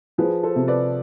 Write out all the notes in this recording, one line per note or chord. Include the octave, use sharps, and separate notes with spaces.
F3 G#4 B4
A4 C5
C3
B4 D5